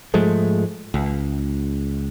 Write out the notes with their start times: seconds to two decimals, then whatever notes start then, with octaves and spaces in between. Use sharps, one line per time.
0.14 G#2 F3 G#3 A3
0.94 C#2